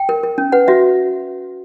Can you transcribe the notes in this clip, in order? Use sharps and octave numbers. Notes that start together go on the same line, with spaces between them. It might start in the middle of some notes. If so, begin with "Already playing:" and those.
Already playing: G5
A#4
A#4
C#4
B4 F#5
F#4 E5